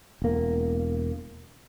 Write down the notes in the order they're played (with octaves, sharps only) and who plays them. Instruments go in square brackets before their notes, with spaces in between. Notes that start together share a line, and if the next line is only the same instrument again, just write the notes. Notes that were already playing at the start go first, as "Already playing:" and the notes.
[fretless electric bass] E1 A#3